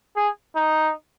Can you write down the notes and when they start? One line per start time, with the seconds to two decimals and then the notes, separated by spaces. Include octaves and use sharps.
0.16 G#4
0.56 D#4